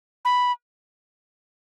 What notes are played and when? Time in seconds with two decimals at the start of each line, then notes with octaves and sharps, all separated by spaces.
0.25 B5